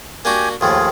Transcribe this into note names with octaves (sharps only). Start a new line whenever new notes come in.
A#3 D4 F#4 G4 G#5
D#2 A2 F3 F4 G#4